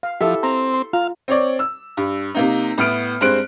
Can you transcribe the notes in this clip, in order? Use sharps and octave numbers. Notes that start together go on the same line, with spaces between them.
F5
F3 E4 G4 A4 E5
C4 A#5
C6
F4 F5 A#5
C4 C#5 D5
E6
G2
C3 A#3 D#4
A2 B3 F6 D7
G2 G#3 C4 C5 F#6 D7